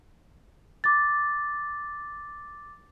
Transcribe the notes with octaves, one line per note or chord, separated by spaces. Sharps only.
D6 A6